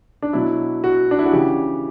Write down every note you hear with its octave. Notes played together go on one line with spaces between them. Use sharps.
D4
B2 F#3 E4
F#4
D4
E4
F#4
C#3 E3 G4